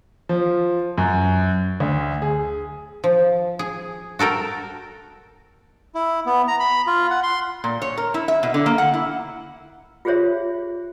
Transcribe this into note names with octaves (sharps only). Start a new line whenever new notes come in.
F3
F#2
D2
G#4
F3
G#4
F#4 A4 A#4 G5
E4
B3
A#5
B5
F4
F#5
C6
A#2
C#5
A#4
E4
E5
B2
D3
A#3
F#5
E4
F4 G4 G#4 C5 C#5 E5